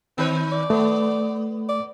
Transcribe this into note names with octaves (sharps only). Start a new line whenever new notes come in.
D#3 C4 B4 C#5
D5
A3 B3
D5